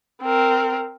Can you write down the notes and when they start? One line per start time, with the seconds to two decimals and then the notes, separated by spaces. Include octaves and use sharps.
0.22 C4 A#4